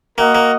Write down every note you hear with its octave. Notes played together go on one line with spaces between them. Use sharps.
A#3 F#4 A#4 D#5 F#5
A#3